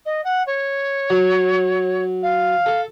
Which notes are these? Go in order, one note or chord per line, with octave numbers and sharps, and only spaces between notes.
D#5
F#5
C#5
F#3
F5
A4